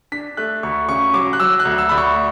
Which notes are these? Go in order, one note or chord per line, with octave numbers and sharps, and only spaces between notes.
D4 B6
A3 F#6
D2 C#6
C#3 C#6
F#3 D6
F#6
F#3 E6
F#6
D2
E6
D2 B5
C#6